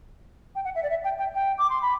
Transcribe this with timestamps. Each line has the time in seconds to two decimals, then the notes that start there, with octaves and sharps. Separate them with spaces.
0.55 G5
0.65 F#5
0.75 E5
0.83 D5
0.90 E5
1.04 G5
1.19 G5
1.35 G5
1.58 D6
1.70 C6
1.82 B5